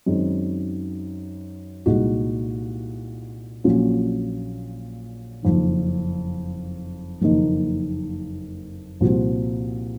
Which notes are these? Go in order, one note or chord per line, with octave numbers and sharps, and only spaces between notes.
F#2 D#3 G#3 C4 D#4
C2 A#2 G#3 D#4 F#4
A#1 A#2 F#3 C#4 F4
F#1 F2 D#3
F#1 F2 D#3 A#3 D#4
C2 A#2 F3 C4 F#4